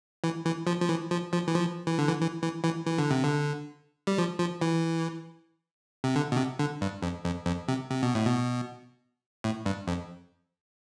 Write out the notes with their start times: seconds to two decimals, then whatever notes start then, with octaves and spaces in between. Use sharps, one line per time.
0.24 E3
0.45 E3
0.67 F3
0.82 F3
0.89 E3
1.11 F3
1.33 F3
1.48 E3
1.55 F3
1.87 E3
1.99 D3
2.08 E3
2.21 E3
2.43 E3
2.64 E3
2.86 E3
2.98 D3
3.11 C3
3.24 D3
4.07 G3
4.18 F3
4.39 F3
4.61 E3
6.04 C3
6.16 D3
6.32 B2
6.37 C3
6.59 D3
6.81 G2
7.03 F2
7.25 F2
7.46 F2
7.68 C3
7.91 C3
8.02 B2
8.15 A2
8.26 B2
9.44 A2
9.66 G2
9.88 F2